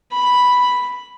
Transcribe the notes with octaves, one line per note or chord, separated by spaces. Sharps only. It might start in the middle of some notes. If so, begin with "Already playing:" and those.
B5